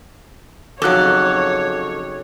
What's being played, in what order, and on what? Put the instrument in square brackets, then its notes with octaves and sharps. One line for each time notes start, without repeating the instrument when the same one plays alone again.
[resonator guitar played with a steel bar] F2 A4 [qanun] C#3 F#3 D#4 [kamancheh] C#5 [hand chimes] D6 F#6